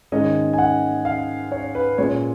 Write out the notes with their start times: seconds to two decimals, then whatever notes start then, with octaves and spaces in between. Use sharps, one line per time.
0.12 G#2 D#3 G#3 C#4 D#5
0.53 G#5
0.58 F#5
1.05 F5
1.52 C#5
1.75 B4
1.98 A#2 G#3 C#4 C#5